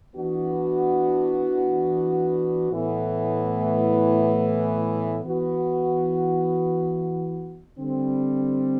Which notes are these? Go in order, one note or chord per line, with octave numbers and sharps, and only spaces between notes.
E3 B3 D4 F#4
A2 E3 B3
E3 B3 F#4
D3 G3 C4